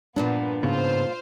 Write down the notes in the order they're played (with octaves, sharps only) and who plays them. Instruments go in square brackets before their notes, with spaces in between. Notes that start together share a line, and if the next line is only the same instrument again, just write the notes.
[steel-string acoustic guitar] G2 A#2 F3 [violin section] B3 [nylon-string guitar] D4
[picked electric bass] G#2 C#3 B3 [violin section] F4 C5